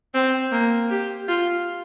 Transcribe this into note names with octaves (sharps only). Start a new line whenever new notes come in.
C4
A#3
G4
F4